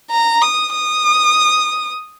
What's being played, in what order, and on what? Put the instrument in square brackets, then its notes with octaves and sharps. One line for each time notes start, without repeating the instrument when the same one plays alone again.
[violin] A#5
D#6
D#6